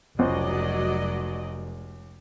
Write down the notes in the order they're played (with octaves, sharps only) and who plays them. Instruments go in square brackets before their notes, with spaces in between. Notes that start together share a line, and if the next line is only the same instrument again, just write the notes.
[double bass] F1 [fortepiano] C#2 C5 [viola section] F#3 D5 D#5